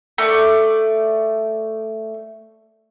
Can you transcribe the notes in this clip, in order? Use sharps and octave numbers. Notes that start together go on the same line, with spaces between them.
A3 D5